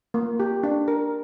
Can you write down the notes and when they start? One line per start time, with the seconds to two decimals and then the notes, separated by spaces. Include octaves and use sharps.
0.14 A#3
0.40 G4
0.63 D4
0.88 A#4